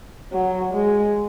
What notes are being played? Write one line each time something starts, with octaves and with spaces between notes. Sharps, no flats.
F#3
G#3